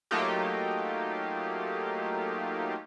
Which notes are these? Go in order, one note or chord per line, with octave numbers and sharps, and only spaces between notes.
F#3 A3 A#3 D#4 F4 G4